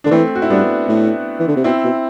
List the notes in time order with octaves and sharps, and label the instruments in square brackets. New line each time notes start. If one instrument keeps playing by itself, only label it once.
[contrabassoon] D3 [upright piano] D4
[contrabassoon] E3 [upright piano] A3 C4
[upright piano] F#4
E4
[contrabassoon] G2 [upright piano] B3 D4
[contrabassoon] A2
E3
D3
C3
[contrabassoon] B2 [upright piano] C4 E4
[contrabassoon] B2